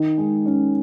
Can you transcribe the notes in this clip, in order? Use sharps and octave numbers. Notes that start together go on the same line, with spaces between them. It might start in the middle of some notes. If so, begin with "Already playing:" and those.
Already playing: D#3
G#3
C#4